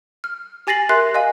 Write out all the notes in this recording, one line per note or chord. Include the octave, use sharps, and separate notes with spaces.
F6
G4 G#5 A6 A#6 C7 F#7
G4 A#4 E5 C6 F#6 C7
D#5 F5 G#5